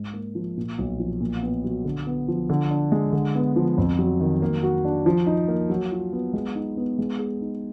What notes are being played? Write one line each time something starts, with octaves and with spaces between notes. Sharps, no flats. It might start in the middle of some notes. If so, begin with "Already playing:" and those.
Already playing: G#2
A#3
F3
A#2
B1
F3
A#2
B3
F#3
D3
B3
F3
D3
D4
G#3
D3
B3
F3
F2
F#3
D#3
A#3
F#4
D4
F3
D#4
A#3
F#3
F4
B3
G#3
D#4
B3
G#3
G#4
D#4